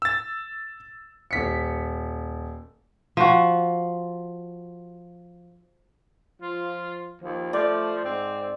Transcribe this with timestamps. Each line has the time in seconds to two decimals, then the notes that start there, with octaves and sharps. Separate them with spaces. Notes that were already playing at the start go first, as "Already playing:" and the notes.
0.02 E6 A6
1.31 D#1 B6 C#7
3.17 F3 F#4
6.42 F3 F4
7.22 D#2 F3
7.53 F3 A3 D5
8.04 G#2 C4